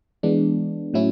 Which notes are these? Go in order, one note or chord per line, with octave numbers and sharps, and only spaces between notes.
E3 G#3 B3 D4
A2 F#3 C#4 E4